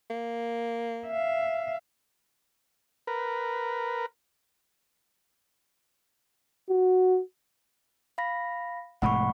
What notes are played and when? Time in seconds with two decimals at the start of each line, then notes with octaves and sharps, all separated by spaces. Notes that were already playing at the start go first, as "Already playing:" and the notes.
0.10 A#3
1.07 E5 F5
3.07 A#4 B4
6.69 F#4
8.18 F5 B5 A#6
9.02 F1 A2 G#3 F#5 B5 C#6